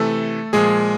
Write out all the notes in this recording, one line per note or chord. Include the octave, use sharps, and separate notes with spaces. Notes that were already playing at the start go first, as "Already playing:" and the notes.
Already playing: C3 E3 A3 A4
A#2 F3 G#3 G#4